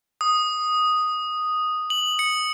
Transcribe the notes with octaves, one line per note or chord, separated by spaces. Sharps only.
D#6
F#7
C#7